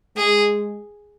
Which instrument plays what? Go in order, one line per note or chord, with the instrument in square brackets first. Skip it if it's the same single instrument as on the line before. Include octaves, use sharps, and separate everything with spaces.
[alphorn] G#3 [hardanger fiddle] G#4